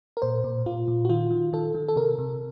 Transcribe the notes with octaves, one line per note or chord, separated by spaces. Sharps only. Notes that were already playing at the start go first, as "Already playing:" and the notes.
A#4
A#2 C5
A#2
A#2 F4
A#2
F#4
D#3 F4
D#3
D#3 A4
D#3
A4
C3 A#4
C3